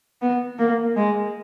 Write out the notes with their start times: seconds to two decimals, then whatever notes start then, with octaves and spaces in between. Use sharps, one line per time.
0.22 B3
0.59 A#3
0.97 G#3